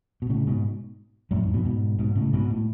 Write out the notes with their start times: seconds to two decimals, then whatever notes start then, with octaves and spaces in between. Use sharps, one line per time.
0.22 B2
0.29 A2 C#3
0.47 G#2 B2
1.31 F#2 A2
1.43 F2 G#2
1.53 G#2 B2
1.65 G#2 B2
1.99 G#2 B2
2.15 A2 C#3
2.33 G#2 B2
2.51 A2